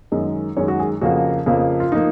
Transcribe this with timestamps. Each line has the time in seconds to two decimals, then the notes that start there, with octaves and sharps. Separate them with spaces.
0.12 F#2 D#3 G#3 D#5
0.57 F#2 D#3 G#3 C#5
0.68 F#4
0.80 G#4
1.01 F2 C#3 F3 A#3 F#4
1.46 F2 C#3 F3 A#3
1.80 F4
1.92 F3 A#3 D#4